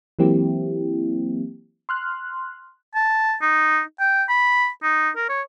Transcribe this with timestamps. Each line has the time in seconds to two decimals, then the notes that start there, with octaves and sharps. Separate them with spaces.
0.19 E3 F#3 A#3 C4 E4 G4
1.89 C6 F6 F#6
2.95 A5
3.42 D#4
4.00 G5
4.29 B5
4.83 D#4
5.16 A#4
5.29 C#5